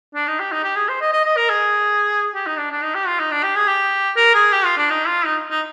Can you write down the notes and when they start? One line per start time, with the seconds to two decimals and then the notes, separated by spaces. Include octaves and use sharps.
0.15 D4
0.27 D#4
0.40 G4
0.52 D#4
0.63 G4
0.76 G#4
0.89 C5
1.01 D#5
1.12 D#5
1.25 D#5
1.37 A#4
1.49 G#4
2.34 G4
2.46 D#4
2.58 D4
2.71 D4
2.83 D#4
2.95 G4
3.07 F4
3.20 D#4
3.31 D4
3.43 G4
3.56 G#4
3.67 G4
4.16 A#4
4.34 G#4
4.52 G4
4.64 F4
4.78 D4
4.90 D#4
5.08 F4
5.25 D#4
5.50 D#4